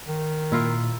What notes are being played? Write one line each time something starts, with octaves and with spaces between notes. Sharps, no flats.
D#3
A#2 E4 F4 A#4